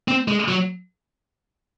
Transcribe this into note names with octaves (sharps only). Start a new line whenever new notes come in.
C4
G#3
F#3